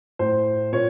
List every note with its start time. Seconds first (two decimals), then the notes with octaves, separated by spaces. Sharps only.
0.19 A2 C5
0.73 A#2 C#5